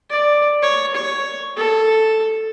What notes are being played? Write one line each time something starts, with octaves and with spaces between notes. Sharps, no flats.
D5
C#5
C#5
A4